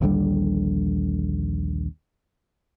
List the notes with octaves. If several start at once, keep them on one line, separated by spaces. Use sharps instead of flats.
A#1 D#2 D3 G3